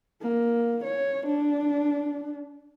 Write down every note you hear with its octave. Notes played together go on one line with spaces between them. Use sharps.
A#3
C#5
D4